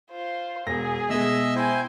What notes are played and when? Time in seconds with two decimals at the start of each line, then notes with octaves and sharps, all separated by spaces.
0.11 F4 C5
0.66 E1 G#4 A#6
1.10 B2 G#3 D#5 E5 E6
1.56 E4 C5 G5 G#5